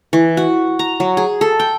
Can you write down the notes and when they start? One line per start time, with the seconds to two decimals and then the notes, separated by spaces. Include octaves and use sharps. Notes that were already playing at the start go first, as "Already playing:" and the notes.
0.13 E3
0.37 F#4
0.79 A#5
1.00 F#3
1.17 G#4
1.41 A4
1.60 G5